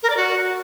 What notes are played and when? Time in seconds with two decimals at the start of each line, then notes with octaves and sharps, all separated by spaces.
0.03 A#4
0.10 D5
0.17 F#4